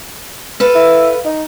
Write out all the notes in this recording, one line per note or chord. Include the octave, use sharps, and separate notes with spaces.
A4 B4 F5
E4
D#4